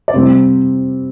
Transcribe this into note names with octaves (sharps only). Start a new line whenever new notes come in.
D5
C3 G3 C4 C5